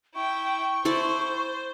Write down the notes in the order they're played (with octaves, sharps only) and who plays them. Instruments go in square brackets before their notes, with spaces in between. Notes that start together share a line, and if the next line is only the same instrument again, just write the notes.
[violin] E4 G5 [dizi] C#6
[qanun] E4 A4 D5 [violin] C5